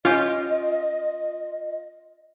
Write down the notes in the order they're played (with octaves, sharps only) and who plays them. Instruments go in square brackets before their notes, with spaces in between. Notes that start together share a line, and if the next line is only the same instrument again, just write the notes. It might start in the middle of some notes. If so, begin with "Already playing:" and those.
[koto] C#4 G4 [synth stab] F4 [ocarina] D#5